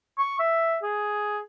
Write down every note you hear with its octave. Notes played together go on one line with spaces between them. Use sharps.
C#6
E5
G#4